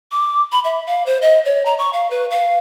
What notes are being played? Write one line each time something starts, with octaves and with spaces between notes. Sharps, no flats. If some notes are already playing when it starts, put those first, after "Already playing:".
D6
B5
E5
F5
C5
D#5
C#5
A#5
C#6
F5
B4
F5